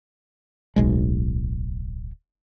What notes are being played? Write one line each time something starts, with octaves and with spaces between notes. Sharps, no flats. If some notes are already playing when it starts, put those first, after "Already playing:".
D1 B1 G#3